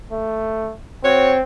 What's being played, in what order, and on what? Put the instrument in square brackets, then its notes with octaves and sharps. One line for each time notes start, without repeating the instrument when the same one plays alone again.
[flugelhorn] A3
[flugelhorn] C4 [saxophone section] F#4 C#5